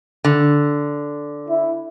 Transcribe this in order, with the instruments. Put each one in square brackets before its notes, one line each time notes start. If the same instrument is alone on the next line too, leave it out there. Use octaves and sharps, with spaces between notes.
[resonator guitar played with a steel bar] D3
[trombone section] E4